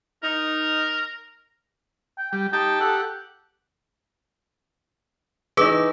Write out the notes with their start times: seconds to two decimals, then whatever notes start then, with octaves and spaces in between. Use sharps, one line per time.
0.23 D#4 A#4
2.18 G5
2.32 G3 G5
2.53 D#4 G4 G5 A5
2.81 G4 A4 F#5
5.57 E3 D#4 G#4 B4 D6